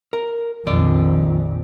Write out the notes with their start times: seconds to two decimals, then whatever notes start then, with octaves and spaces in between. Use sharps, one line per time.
0.13 A#4
0.67 A#1 F2 D#3 D5